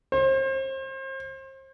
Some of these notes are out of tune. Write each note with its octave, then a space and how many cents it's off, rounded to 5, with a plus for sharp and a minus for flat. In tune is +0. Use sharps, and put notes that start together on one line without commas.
C5 +35